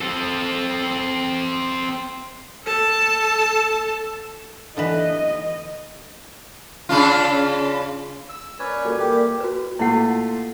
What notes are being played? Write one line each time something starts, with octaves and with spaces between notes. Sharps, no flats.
C4 A4
A4 A5
D3 E3 B4 D#5
C#3 D4 F4
E6
C#4 A#4 B4 C#5 D5
A#2 G3 F#4 A4 D5
E3 G4
F#4 B4
A#2 A3 E4 F4 F#5